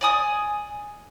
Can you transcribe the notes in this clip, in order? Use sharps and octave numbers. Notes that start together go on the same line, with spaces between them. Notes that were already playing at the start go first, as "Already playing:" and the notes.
D5 G#5 D#6